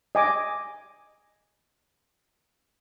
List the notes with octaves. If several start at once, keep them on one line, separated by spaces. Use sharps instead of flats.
D#5 G#5 D6